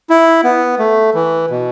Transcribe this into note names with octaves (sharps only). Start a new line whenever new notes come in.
E4
B3
A3
E3
B2